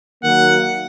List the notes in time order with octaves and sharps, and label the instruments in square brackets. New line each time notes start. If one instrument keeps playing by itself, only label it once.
[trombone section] D#3 F#3 A#3 [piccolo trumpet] F#5